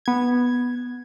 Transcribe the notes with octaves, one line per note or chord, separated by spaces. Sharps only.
B3 G#6